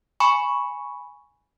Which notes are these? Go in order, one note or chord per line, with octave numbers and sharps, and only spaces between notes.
G#5 B5 C#6